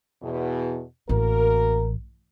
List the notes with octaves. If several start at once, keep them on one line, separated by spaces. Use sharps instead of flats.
E2 B2
A1 A#3 F#4 A#4